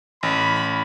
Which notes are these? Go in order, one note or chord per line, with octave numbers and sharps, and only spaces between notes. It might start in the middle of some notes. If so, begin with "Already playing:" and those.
A1 B5